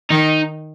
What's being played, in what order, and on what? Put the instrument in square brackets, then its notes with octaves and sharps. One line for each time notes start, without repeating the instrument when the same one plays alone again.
[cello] D#3 [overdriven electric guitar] D#4